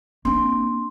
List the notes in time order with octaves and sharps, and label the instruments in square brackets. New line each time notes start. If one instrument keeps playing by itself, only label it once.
[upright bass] A#3 C4 [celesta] D4 C6